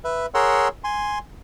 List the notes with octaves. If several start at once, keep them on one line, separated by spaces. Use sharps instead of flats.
B4 E5
G#4 A#4 C#5 F#5 C6 E6
G#5 C6